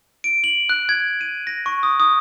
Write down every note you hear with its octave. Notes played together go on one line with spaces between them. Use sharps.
D7
F#7
F#6
G#6
D#7
A#6
C#6
D#6
D#6